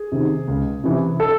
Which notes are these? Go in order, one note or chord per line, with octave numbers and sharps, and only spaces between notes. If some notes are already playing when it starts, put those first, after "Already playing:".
Already playing: G#4
C3 D#3
C#2
C3 E3
A4